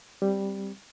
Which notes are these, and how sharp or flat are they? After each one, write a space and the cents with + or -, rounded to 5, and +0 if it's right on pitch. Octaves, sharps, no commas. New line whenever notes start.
G3 +0 C4 +0